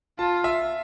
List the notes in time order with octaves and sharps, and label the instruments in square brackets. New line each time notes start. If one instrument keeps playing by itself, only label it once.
[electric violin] F4 [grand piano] A5
[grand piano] E5